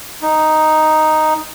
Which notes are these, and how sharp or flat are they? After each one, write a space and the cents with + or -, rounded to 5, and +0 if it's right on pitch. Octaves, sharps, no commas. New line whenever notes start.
D#4 +0